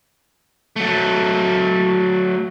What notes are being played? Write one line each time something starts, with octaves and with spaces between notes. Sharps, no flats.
F#3 A3